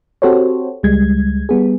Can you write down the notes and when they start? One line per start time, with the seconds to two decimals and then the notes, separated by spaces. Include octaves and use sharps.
0.22 C4 F#4 G4 A4 C5 C#5
0.83 C#2 G3 G#3 G#6
1.49 G3 B3 G#4